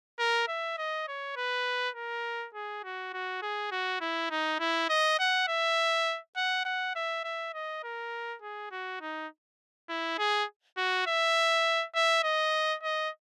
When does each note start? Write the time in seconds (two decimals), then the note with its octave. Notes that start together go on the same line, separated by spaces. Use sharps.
0.19 A#4
0.48 E5
0.78 D#5
1.08 C#5
1.36 B4
1.95 A#4
2.54 G#4
2.84 F#4
3.14 F#4
3.42 G#4
3.71 F#4
4.01 E4
4.31 D#4
4.60 E4
4.89 D#5
5.19 F#5
5.48 E5
6.36 F#5
6.65 F#5
6.95 E5
7.24 E5
7.54 D#5
7.84 A#4
8.42 G#4
8.71 F#4
9.01 D#4
9.89 E4
10.18 G#4
10.77 F#4
11.07 E5
11.95 E5
12.24 D#5
12.83 D#5